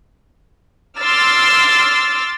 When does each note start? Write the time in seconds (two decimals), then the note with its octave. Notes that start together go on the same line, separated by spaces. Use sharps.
0.99 C6 D6 E6 F6 A6